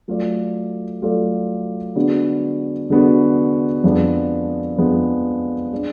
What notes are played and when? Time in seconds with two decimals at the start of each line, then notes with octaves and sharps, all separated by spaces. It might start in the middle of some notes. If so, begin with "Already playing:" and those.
0.08 F#3 A3 F4 A4 D5
1.02 F#3 A3 F4 A4 D5
1.95 D3 G#3 B3 D4 F#4
2.90 D3 G#3 B3 D4 F#4
3.84 F2 F3 G#3 B3 D4
4.78 F2 F3 G#3 B3 D4
5.72 G#3 D4